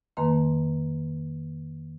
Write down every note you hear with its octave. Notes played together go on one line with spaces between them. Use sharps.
F2 D#3 A#3 B4 A#5 C6